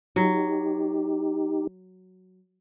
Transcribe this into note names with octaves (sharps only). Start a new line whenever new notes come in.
F#3 D#4 G4